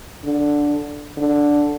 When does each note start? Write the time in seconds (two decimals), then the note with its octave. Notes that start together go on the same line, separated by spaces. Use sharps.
0.24 D3
1.17 D3